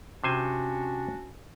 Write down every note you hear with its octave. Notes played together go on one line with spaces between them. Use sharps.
C3 C#4 D4 F#4 C5 G#5